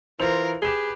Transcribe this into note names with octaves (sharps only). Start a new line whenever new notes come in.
E3 F4 A#4 C5 C6 F7
G4 G#4 B4 E7 G7